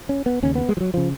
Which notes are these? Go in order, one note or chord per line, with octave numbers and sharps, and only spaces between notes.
C#4
B3
D#2 C#3 C#4
B3
G#3
F3
F#3
C#3 F3